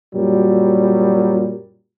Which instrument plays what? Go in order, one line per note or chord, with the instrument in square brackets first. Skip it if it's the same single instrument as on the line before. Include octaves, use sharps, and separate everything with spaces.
[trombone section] F#2 A#2 F#3 G3